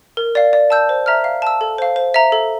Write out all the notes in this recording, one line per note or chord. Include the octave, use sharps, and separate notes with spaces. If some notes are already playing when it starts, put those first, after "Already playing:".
A#4
D5 F5
D5
A5 E6 G6
C5
E5 A#5 F6
F5
A5 E6
A4
C5 F5
C5
E5 A#5
A4